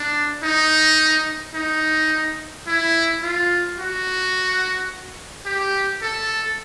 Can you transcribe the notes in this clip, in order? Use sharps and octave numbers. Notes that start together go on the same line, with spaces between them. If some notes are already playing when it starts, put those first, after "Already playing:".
Already playing: D4
D#4
D#4
E4
F4
F#4
G4
A4